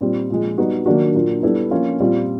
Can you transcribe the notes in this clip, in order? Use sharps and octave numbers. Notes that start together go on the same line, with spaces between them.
A#2 G3 C4
A#2 F3 G#3
G3 B3 D#4 F#4
D#3 F#3 A#3 D4 F#4
A#2 F#3 A#3 D4
G3 B3 E4 A4
F3 A#3 C#4 F4
A#2 G3 C4 F4